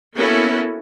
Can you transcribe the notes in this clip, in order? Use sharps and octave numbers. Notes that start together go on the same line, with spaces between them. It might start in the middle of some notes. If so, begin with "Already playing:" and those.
A#3 B3 C#4 E4 F#4 A4